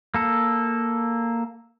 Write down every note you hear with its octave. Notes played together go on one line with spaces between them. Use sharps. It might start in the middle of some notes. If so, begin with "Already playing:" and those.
A#3 A4